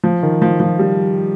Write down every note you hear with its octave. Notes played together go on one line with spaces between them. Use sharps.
F3
D#3
F3
F3
G3